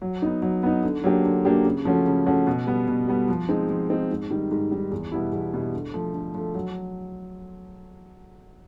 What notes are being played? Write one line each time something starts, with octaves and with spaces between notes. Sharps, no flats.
F#3
B3 D#4
F#3
B3 D#4
D3
F#3 A#3 D4 G4
D3
F#3 A#3 D4 G4
C#3
F3 A3 C#4 F#4
C#3
F3 A3 C#4 F#4
B2
G3 B3
B2
G3 B3
F3
G#3 C4 D#4
F3
G#3 C4 D#4
G#2
D#3 G3
G#2
D#3 G3
E2
B2 G3 B3 E4
E2
B2 G3 B3 E4
D3
F3 A3
D3
F3 A3
F#3